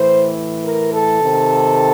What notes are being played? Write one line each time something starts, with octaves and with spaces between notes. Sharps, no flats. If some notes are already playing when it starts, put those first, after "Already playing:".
Already playing: A2 E3 C5
A#4
A4
C3 D#3